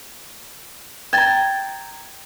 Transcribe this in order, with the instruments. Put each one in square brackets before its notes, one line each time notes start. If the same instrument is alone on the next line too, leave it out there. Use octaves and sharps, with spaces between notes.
[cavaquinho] G5 A#5 [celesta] G#6 A6